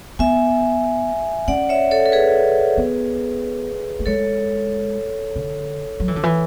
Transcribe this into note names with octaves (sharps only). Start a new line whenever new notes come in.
B3 E5 G#5
C#4 D5 F#5
C#5 E5
A4 C#5
A4
G#4 B4
B3
A3
G#3 A4 C#5
D3
F#3
E3
D3
E3